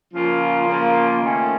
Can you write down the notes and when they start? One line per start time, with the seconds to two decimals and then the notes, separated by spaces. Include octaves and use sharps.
0.13 C#3 F3 A#3 F4
0.65 C#3 F3 A#3 F4
1.19 D#3 A3 C#4